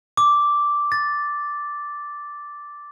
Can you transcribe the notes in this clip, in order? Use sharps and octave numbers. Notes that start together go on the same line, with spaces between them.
D6
A6